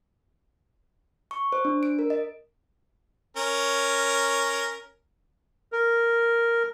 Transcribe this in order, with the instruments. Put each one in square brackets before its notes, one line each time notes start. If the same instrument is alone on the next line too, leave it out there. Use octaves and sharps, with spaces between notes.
[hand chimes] C#6
C5
D4
D7
A#4
D#5
[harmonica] C#4 A#4
[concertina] A#4